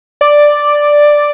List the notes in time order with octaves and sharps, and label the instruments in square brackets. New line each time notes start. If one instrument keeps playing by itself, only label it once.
[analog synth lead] D5